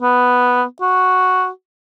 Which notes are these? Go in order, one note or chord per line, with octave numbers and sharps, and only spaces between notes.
B3
F#4